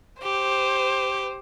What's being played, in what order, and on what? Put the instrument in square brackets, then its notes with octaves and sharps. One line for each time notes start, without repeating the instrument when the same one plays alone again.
[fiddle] G4 [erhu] C5